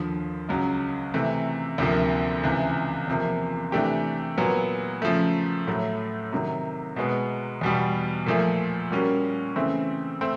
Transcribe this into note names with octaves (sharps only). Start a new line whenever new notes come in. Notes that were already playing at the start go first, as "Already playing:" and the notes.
Already playing: D#2 D3 F3
C#2 C#3 F#3
C3 E3 A3
D2 C3 F3 A#3
C#2 C3 E3
E2 C3 F3 A#3
C3 E3 A3 D4 G4
A#2 F#3 B3
C#3 F3 A3
A2 F#3 A3
C3 D#3 F#3
B2 G#3 B3
E2 B2 G3
A#2 F3 A3
A#2 G3 A#3 C#4 F#4
C#3 E3 A3 C4
A3 C4